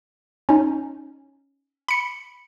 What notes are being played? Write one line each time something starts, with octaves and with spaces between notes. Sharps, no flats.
C#4 D#4
B5 C#7